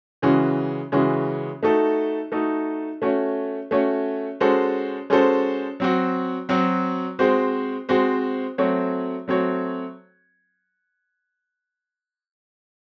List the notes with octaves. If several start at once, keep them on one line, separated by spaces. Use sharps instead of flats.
C#3 E3 G#3 C#4 F#4
C#3 E3 G#3 C#4 F#4
A3 D#4 F#4 A4
A3 D#4 F#4 A4
A3 C#4 F#4 C#5
A3 C#4 F#4 C#5
G#3 C#4 F#4 A4 C5
G#3 C#4 F#4 A4 C5
F#3 C4 F#4
F#3 C4 F#4
G#3 C4 F#4 C5
G#3 C4 F#4 C5
F#3 A3 C4 F#4 C#5
F#3 A3 C4 F#4 C#5